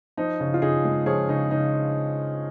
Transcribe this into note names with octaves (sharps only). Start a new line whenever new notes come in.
F3 D#4
C#3
F4
C#3 D#4 G#4
G#3
F3 G#4 C#5
C#3 D#4
C#3 D#4